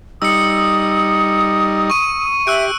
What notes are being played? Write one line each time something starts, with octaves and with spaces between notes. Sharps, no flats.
G3 D#4 D#6 E6 C#7
C#6 D#7
G4 E5 E6 F#6 D7